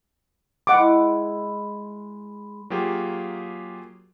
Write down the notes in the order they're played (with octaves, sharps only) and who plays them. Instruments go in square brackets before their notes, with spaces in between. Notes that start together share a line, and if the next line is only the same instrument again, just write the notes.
[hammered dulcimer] G#3 E4 [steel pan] F#5 D6
[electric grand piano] F#3 A#3 F4 G4 G#4